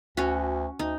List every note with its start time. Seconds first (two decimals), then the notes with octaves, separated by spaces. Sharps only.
0.17 D2 C#4 F#4
0.79 D2 D#4